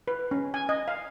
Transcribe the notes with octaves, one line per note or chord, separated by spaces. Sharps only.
B4
C#4
G#5
D#5
F5